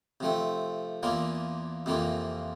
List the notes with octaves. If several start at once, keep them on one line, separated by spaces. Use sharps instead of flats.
C3 F3 A3 C4
E2 E3 A#3 D4 F4
F2 C3 E3 A#3 F4